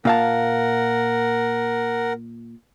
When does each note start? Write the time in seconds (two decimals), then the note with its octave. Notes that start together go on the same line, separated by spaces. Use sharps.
0.05 A#2 A#4 F5 F#5 A5